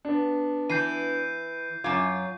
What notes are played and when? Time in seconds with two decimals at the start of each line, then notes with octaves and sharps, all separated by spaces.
0.05 B3 D4
0.70 E3 G6 C7 D#7
1.84 F#2 F4 D6 G#6